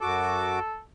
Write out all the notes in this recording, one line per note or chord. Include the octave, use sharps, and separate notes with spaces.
F#2 F#4 A4 D6